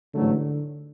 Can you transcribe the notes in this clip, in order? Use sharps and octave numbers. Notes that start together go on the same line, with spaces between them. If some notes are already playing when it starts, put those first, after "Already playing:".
A1 G#2 D3 F#3 A3